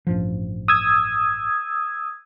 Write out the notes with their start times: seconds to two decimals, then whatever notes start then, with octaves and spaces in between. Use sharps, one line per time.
0.07 A1 G2 F3
0.68 D#6 E6 G#6